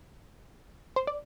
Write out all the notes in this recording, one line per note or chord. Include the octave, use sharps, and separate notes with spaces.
C5
D5